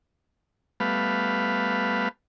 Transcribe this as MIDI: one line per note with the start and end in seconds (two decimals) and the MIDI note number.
0.80 2.09 55
0.80 2.09 57
0.80 2.09 59
0.80 2.09 71
0.80 2.09 77